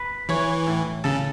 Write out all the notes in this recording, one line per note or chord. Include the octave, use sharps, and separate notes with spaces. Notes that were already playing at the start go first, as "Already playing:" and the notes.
Already playing: B4
E3 C#5
A2
C#3 A4